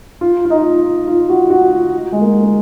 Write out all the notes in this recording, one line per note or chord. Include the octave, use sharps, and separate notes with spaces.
F4
F4
D#4
F4
F#4
F#4
F4
G#3
A#3
A#3